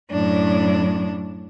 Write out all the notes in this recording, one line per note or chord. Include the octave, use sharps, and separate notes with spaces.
F#2 A2 D4